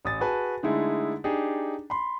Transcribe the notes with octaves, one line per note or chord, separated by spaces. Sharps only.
A1 D#6 A6
F#4 G#4 B4 G#5 A5
D3 G#3 A3 D#4 E4 G#4
D4 D#4 G4 G#4
B5 C6